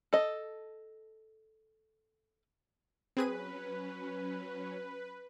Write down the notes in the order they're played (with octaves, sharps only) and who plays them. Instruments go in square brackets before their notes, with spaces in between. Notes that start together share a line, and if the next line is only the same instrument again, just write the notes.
[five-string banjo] A4 D#5
[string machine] F#3 C#4 [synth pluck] C4 G#4 D#7 [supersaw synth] B4